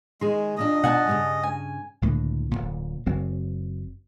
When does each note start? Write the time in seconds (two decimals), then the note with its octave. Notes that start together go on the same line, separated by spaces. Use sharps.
0.21 D#3 G#3 G#4 C6
0.57 D#2 A#2 D4 D#5
0.84 B2 F#5 G#5 A5
1.07 G2 A#2 C#3
1.43 G#5
2.02 C#2 A2 D3 A#3
2.51 D1 A#1 A#2
3.06 F#1 F#3 C4